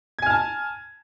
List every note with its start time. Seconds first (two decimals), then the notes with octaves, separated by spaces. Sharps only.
0.19 G#6
0.22 G#5
0.26 F6
0.30 A5